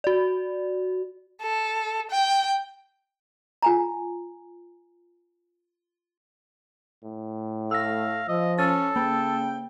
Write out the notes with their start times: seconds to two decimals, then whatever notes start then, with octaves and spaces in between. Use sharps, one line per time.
0.04 F#4 D5
1.42 A4
2.11 G5
3.62 F4 G#5 A#5
7.04 A2
7.71 A3 F5 E6 A#6
8.28 F3 D#5
8.58 C#4 A4 A6
8.96 C#3 A#3 G5